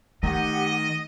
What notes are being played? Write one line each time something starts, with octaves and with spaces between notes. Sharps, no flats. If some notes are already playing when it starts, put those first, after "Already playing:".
D#3 A3 G4 D#5 F#5